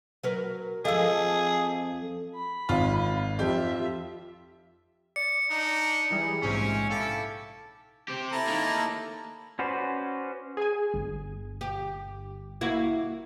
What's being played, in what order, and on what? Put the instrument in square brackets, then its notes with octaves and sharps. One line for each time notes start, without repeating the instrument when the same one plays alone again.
[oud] F#3 A#4 B4
[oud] F2 [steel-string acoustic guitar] F3 A4 [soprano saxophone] G#4 [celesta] D#5 F5 E6
[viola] B5
[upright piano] G#1 [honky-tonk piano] F4
[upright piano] F2 [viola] F4 E5 [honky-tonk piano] G4
[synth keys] D5 [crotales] C#7
[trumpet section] D4 D#4
[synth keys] E3 G3 G#4
[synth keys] A#1 G#2 C3 [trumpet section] C4 C#4
[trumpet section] E4 A4 [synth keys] F5 G5 D6
[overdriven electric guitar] C4 G4
[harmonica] E4 A4 A#5
[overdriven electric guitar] D#3 A#3
[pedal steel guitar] C#4 F#4 B4 C5 D5
[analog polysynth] G#4 G#5
G1
[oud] G4
A#3 E4 F#4